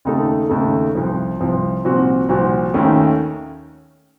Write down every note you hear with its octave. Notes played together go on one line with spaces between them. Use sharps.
D#2 C#3 A3 D#4 A4
D#2 C#3 A3 D#4 A4
C2 C3 F3 C4
C2 C3 F3 C4
C2 A#2 F3 C4 F#4
C2 A#2 F3 C4 F#4
D#2 D#3 A3 C#4